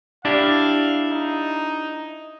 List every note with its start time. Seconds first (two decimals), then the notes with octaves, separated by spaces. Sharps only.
0.25 D4 E4 G4 F5
1.11 D#4